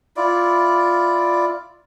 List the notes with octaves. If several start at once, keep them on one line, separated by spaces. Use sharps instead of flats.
E4 F4 D5